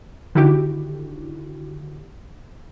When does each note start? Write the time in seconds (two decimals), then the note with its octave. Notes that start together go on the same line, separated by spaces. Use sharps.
0.35 D3 D#3 E4 F#4 G4